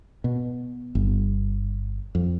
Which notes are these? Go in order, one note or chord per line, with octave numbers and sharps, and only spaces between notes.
B2
G1
F2